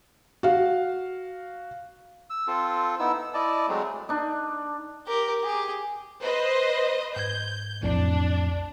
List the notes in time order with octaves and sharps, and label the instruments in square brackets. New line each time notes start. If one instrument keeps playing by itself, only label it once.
[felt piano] F#4 F5
[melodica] E6
C4 F4 A4
B3 D#4 E4 E6
E6
E4 D5 D#5 A5
F#3 G#3 A3 C4
[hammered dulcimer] D4 D#4
[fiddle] G4 A#4
G4 G#4
[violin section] B4 C5 D#5
[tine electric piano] G#2 G#6 [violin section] G6
[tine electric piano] B1 F2 A2 [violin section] D4